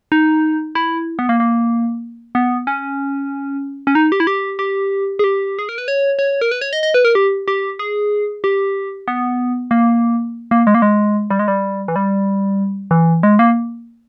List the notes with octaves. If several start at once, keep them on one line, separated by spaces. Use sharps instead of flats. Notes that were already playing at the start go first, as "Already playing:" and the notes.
D#4
E4
B3
A#3
A#3
B3
C#4
C#4
D#4
G4
E4
G4
G4
G#4
G4
G#4
A#4
B4
C#5
C#5
A#4
B4
C#5
D#5
D#5
B4
A#4
G4
G4
G#4
G4
B3
A#3
A#3
G#3
A#3
G#3
G3
G#3
G3
E3
G3
E3
G#3
A#3